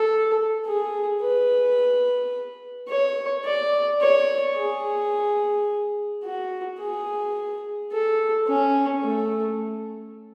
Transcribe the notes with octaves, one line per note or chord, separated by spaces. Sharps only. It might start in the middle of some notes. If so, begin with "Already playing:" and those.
Already playing: A4
G#4
B4
C#5
D5
C#5
G#4
F#4
G#4
A4
C#4
A3